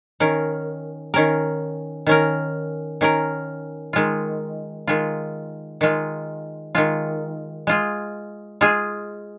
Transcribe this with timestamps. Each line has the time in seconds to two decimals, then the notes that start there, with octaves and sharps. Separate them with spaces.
0.20 D#3 C#4 A#4
1.14 D#3 C#4 A#4
2.07 D#3 C#4 A#4
3.01 D#3 C#4 A#4
3.93 D#3 G#3 F4
4.88 D#3 G#3 F4
5.81 D#3 G#3 F4
6.75 D#3 G#3 F4
7.67 G#3 F4 G#4
8.61 G#3 F4 G#4